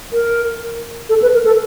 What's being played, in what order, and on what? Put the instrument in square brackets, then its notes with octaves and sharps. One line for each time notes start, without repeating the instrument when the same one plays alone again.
[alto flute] A#4
A4
B4
A#4
A4